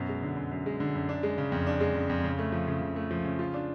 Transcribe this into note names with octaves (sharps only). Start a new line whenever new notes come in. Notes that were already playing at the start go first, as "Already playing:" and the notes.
Already playing: F#2 B2
G#3
D3
F#2
F#2
G#3
D3
F#2
D4
G#3
C#3
F2
D4
G#3
C#3
F2
C#3
A3
F3
C#3
C#3
A3
F3
C#3
F4
D4